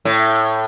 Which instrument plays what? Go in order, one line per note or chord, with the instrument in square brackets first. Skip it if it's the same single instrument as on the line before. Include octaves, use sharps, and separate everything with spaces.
[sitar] A2